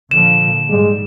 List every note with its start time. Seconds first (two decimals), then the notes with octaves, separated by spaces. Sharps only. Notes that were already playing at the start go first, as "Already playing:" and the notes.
0.11 A#2 D3 F3 E7
0.69 G#2 G3 G#3